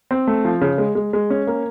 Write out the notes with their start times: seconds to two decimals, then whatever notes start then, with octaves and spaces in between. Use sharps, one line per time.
0.11 C4
0.27 A3
0.45 F3
0.61 C#3
0.78 G#3
0.95 G#3
1.13 G#3
1.30 C#4
1.47 A#3